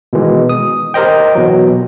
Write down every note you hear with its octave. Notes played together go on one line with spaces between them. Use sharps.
B2 D#3 E3 G#3
D#6
G4 A#4 C5 D#5 G5
B2 E3 F#3